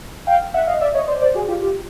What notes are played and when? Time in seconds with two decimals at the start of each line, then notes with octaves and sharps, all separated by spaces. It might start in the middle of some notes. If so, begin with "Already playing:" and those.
0.27 F5 G5
0.54 E5 F#5
0.67 D#5 F5
0.81 D5 E5
0.94 C#5 D#5
1.08 C5 D5
1.22 C5 D5
1.35 F#4 G#4
1.48 F4 G4
1.62 F4 G4